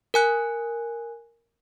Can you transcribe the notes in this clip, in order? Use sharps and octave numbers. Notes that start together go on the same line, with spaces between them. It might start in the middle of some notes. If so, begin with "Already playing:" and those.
A#4 G#5 F#6